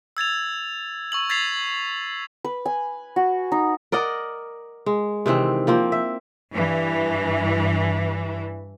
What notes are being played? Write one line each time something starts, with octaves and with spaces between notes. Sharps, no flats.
E6 G#6 A6 F7
C#6 E6 F#7
G#6 A6 B6 C7 F7
B4
G#5
F#4
D#4
A#4 D5 D#5 F#5
G#3
C3 D#3 E3 C4
F3 A#3 C4
E5
G2 E3